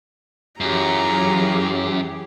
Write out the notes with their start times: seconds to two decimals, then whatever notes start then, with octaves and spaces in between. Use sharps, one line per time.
0.61 F#2 E3 F#3 F4 G4 G#4 A#5